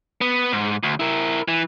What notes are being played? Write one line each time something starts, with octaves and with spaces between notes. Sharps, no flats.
B3
G#2
D2
E4 A#4
E3